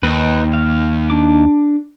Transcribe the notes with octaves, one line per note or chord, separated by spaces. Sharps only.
D#2 D#4 B4
F5
D4 D6